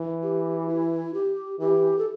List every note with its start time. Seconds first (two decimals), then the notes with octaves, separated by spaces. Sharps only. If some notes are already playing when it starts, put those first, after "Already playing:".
Already playing: E3
0.23 G4
0.69 E4
1.14 G4
1.60 E3 G4
1.99 A4